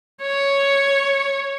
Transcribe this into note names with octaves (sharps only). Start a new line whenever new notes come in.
C#5